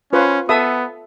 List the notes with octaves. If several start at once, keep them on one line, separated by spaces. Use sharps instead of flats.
C#4 F4 B4 C5
B3 A4 E5 D#6